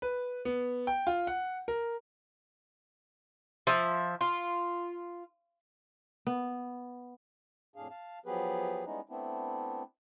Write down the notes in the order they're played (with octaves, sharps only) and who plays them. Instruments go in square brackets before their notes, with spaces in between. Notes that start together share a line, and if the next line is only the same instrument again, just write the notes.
[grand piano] B4
B3
G5
F4
F#5
A#4
[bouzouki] F3 E5
F4
[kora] B3
[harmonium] F2 A2 D4 G#4 F5
F5 A5
F3 F#3 B3 G4 G#4 B4
G3 G#3 B3 C#4 D#4 E4
A3 B3 C4 D4 E4